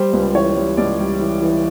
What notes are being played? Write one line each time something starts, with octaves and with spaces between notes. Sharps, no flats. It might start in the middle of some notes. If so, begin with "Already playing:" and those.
Already playing: G3 C5
C#2
E3 C#5
G3
C#2 D5
G3
E3
E3